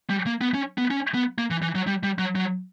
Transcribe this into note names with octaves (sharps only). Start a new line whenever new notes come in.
G3
A#3
B3
C#4
B3
C#4
B3
A#3
E3
E3
F#3
G3
G3
F#3
F#3